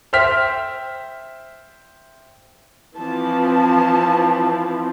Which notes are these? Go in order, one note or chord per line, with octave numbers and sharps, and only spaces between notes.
C5 E5 G5 F6 B6
E3 F3 C4 A5